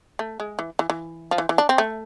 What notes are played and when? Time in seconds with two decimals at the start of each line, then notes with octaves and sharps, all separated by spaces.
0.19 A3
0.40 G#3
0.59 E3
0.79 E3
0.90 E3
1.31 F3
1.38 E3
1.49 E3
1.58 D4
1.69 C4
1.78 A3